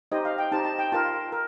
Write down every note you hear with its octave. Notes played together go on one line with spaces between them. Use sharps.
D#4 G4 C5 D#5
F5
G5
D#4 G4 C5 A5
A5
G5
F4 A#4 A5
A#4